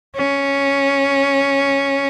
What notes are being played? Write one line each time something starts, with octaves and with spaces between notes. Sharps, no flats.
C#4